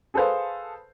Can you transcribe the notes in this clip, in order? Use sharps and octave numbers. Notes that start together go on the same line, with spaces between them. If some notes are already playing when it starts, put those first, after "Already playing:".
G#4 A4 B4 C5 F5